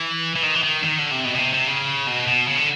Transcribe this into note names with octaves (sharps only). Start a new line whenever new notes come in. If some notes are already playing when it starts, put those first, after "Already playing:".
Already playing: E3
E3
D#3
E3
D#3
D#3
D3
C3
B2
B2
C3
C3
C#3
B2
B2
C#3
D3